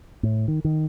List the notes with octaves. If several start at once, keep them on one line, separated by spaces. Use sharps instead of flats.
A2
D#3
D#3